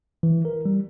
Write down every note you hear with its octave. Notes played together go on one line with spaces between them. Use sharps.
E3
A#4
G3